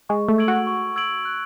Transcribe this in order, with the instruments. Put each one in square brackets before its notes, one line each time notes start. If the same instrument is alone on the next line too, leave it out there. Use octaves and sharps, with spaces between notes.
[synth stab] G#3 [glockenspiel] C#6
[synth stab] A3
[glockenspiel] E6 G#6 D7 F#7
[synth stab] F#4
[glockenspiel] C#6
E6 G#6 D7 F#7
F#6